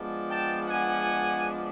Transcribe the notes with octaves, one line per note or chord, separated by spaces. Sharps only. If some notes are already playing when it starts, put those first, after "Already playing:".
Already playing: F3 G#3 B3 D4
G5 A5
F#5 G#5